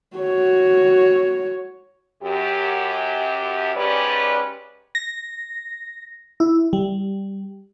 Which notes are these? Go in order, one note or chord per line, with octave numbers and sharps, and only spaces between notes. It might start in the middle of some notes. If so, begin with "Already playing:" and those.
F#4 C#5
F#2 G4
G#2 C#4 G4 B4 D5
A#6
E4
G3